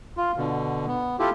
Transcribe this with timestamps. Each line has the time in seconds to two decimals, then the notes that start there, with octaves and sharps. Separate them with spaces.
0.17 F4
0.37 B2 D3
0.87 B3
1.19 E4 F4 G4 A4